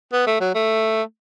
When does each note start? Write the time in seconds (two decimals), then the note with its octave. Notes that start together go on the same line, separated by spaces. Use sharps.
0.13 B3
0.27 A3
0.41 F#3
0.55 A3